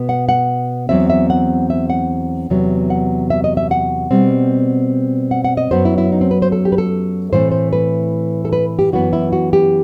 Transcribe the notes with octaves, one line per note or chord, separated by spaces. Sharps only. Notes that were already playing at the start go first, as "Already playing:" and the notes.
Already playing: B2 B3
F#5
F#5
E2 C3 F#3 C4 E5
E5
F#5
E5
F#5
E2 C3 F#3 B3
F#5
E5
D#5
E5
F#5
B2 G3 C4
F#5
F#5
D#5
F#2 F#3 B3 C5
E4
E4
D#4
C4
B4
C5
A4
G4
B4
A4
A2 E3 A3 C4 C5
C5
B4
A4
B4
G4
F#2 E3 B3 F#4
E4
F#4
G4